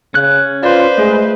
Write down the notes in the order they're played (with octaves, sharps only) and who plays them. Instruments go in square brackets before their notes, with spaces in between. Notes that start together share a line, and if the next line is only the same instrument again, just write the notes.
[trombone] C#3 [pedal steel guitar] C#4 F#6
[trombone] F4 [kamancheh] B4 C5 [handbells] D5
[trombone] G#3 [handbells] A3 G#4